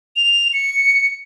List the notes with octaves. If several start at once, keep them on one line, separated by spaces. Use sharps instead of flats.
F7
C#7